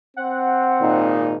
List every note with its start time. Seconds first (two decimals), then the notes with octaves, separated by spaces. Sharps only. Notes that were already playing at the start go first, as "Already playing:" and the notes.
0.16 C4 F#5
0.81 G#1 A#2 D#4